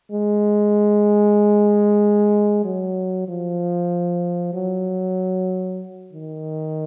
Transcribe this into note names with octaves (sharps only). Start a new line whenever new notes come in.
G#3
F#3
F3
F#3
D#3